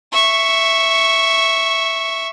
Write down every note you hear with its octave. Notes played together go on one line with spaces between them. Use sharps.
E5 C#6